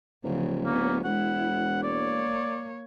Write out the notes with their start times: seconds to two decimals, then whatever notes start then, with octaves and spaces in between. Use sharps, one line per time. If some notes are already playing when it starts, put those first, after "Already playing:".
0.24 D1 C#3 F3
0.65 A#3 B3 C#4
1.05 E1 G#3 E4 F#5
1.83 A#3 C#5 D5